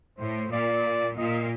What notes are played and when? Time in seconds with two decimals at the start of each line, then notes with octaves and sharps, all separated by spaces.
0.18 A2 C5
0.52 A#2 D5
1.17 A#2 D#5